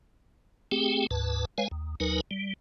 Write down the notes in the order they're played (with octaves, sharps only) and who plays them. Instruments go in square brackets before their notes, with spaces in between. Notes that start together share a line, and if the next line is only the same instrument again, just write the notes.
[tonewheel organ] A3 C4 G4 G#4 G5
D2 G#2 B4 A5
G#3 B4 C#5 F5 G#5
D#2
D#2 F#3 D#4 A#4 B4 G#5
G3